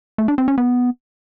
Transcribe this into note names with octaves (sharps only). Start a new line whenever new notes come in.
A3
D4
C4
C#4
B3